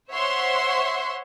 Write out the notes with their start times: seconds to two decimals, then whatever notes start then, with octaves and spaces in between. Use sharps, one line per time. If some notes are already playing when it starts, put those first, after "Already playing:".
0.11 C5 C#5 E5 F#5 C6 C#6